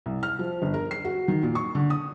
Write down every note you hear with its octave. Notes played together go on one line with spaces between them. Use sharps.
C2
F6
F3
G1
A#4
C7
F#4
D#3
A#2
C#6
D3
D#6